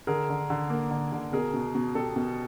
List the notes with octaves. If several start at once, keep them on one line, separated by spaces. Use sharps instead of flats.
D3 G#4 A#4
D3
D3
A#3
D3
D3
B2 G#4 A#4
B2
B2
B2 G4 A4
B2